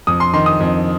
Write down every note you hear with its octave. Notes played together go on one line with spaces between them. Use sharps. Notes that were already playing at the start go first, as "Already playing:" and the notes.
F2 D#6
C6
D#3 C6
D#6
F2